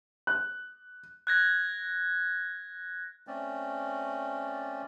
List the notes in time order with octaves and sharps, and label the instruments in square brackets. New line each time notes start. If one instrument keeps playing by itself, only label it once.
[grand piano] F#6
[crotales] F#6 G#6 A#6
[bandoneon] A3 C4 C#4 D5